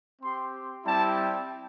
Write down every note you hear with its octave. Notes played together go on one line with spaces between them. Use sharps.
C4 G4 C6
G3 C4 E4 G4 A5